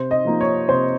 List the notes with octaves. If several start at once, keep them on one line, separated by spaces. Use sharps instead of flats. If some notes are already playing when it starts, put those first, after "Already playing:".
Already playing: C3 C5
D#5
F3 A#3 D#4
C#5
C3 C5